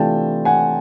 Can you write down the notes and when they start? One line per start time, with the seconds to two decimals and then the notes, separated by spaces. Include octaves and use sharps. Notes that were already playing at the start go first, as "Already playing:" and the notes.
Already playing: C3 E3 A3 D4 F4 G5 A5
0.45 F#5 G#5